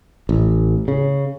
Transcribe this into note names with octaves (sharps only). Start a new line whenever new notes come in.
A1
C#3